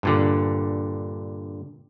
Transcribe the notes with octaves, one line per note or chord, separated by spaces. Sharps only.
G2 A#2 D3